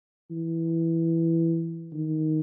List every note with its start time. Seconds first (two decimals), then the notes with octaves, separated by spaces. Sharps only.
0.31 E3
1.93 D#3